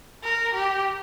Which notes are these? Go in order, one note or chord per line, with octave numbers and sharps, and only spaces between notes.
A#4
G4